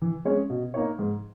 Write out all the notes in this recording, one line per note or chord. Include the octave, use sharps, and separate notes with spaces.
E3
G#3 C#4 G#4 C#5
B2
A#3 D#4 A#4 C#5
G#2